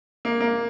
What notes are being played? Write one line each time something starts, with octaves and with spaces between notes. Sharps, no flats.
A#3
A#3